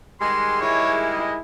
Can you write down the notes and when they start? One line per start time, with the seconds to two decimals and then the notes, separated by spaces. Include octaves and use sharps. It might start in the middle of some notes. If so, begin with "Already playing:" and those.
0.21 D#3 G3 G#3 C6
0.61 E4 C#5
1.09 D#5